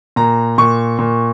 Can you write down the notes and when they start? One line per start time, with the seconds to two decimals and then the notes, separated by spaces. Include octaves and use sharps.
0.16 A#2 A#5
0.58 A#2 C#6
0.99 A#2